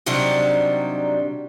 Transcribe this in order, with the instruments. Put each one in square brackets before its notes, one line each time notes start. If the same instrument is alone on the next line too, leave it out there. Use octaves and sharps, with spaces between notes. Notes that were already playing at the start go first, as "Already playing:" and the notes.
[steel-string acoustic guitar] C3 D#3 F#3 G3 D4 G4